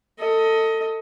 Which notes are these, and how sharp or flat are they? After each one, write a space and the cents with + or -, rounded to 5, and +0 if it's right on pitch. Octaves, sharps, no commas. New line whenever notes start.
A4 +25 D#5 +20